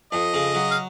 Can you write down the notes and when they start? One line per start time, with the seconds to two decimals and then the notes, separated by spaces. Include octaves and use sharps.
0.12 F2 D#5
0.34 C#3
0.55 F#3
0.71 F5